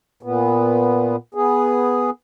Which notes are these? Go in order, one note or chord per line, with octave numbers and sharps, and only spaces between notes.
A#2 B3
B3 G#4